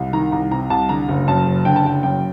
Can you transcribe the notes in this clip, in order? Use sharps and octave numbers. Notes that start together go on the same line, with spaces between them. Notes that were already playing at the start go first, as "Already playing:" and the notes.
Already playing: C2
D#3 A#5
C2 A#5
C3 A#5
C2 A5
D3 A#5
F#1
F#2 A5
F#1
D3 G5
A5
F#1 G5
F#2 G5